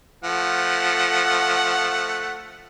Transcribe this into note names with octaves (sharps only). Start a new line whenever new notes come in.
F3 A3 F#5